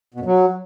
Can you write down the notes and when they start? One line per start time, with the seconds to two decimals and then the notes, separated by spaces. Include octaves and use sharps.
0.14 B2
0.20 F#2
0.26 F#3